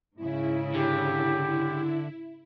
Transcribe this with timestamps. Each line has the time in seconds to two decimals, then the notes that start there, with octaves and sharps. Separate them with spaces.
0.16 G#2 C#3 E4
0.74 D3 G4